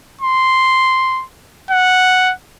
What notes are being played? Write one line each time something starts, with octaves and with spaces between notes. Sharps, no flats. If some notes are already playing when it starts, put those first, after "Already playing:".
C6
F#5